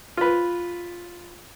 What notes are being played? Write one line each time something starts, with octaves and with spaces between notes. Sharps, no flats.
F4 B4